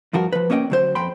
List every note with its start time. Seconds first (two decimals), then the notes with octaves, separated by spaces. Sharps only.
0.13 G2 F3 F#4 A#4
0.33 F3 B4
0.50 A#3 C#4 D#5 E5 G5
0.70 D2 F#3 C5
0.95 F2 G5 B5 C6